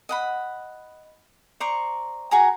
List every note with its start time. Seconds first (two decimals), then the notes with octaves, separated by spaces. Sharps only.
0.09 D#5 F#5 B5
1.60 C5 D5 A#5 C#6
2.31 F#4 G#4 G#5 A#5